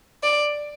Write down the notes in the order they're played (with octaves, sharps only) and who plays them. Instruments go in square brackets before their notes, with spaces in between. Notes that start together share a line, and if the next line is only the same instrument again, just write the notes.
[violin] D5